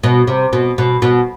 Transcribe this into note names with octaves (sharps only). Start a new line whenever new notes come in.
B2
C3
B2
B2
B2